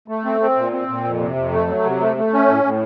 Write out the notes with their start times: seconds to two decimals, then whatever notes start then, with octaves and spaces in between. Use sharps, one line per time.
0.08 A3
0.25 C4
0.40 C4
0.56 A#2
0.72 C4
0.88 A#2
1.04 F2
1.20 C3
1.36 F2
1.52 A3
1.68 F#3
1.85 C3
2.00 A3
2.17 A3
2.32 C#4
2.47 A2
2.64 A2